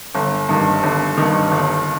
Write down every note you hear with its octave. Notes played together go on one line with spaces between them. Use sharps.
G1
G2 D#3
G1
G2 D#3
G1